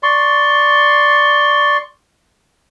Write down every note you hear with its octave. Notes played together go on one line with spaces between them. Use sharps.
D5 C6 C#6